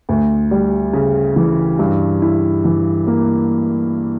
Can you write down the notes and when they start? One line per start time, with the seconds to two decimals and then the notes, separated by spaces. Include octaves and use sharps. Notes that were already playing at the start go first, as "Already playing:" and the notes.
0.09 D2
0.51 G3
0.93 C#3
1.36 E3
1.79 G2
2.22 E4
2.64 E3
3.07 A#3